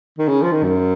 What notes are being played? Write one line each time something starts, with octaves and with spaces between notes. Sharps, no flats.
D#3
C#3
F3
D#3
F#2